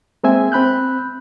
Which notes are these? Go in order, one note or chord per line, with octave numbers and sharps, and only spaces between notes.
G#3 A#3 C4 G#4 E5 G#5
C4 B5 F#6 G6